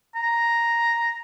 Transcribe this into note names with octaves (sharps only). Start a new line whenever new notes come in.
A#5